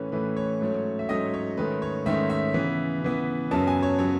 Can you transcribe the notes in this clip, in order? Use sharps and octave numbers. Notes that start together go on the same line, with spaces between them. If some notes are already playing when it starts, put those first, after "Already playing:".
Already playing: A2 E3 A3 C#4 B4
A2 E3 A3 C#4 B4
C#5
G#2 F#3 A3 C#4
E5
G#2 F#3 A3 C#4 D#5
C#5
G#2 D#3 A3 C#4 B4
C#5
G#2 D#3 A3 C#4 E5
E5
C#3 E3 B3
C#3 E3 B3
F#2 C#3 F#3 B3 A5
G#5
C#5
C#3 F#3 B3 C#5